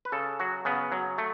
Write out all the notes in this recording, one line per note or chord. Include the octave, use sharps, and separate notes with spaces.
B4
C#3 A4
F#3 F#4
C#3 B3
F#3
A3